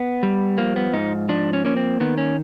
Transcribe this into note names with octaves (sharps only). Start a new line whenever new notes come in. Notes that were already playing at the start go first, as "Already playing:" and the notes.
Already playing: B3
G3
F3 A#3
B3
G#2 D#4
F3 D4
C#4
A#3 C#4
C4
D#3 B3
C#4